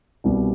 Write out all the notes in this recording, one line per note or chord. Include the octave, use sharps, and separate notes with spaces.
C2 B2 G3